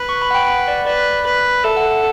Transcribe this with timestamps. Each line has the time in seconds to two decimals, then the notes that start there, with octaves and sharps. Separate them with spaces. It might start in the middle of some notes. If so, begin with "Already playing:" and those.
Already playing: B4
0.09 C#6
0.22 B5
0.31 F#5
0.35 G5
0.48 F#5
0.68 D5
0.86 B4 D5
1.26 B4
1.64 A4 E5
1.77 F#5
1.91 F#5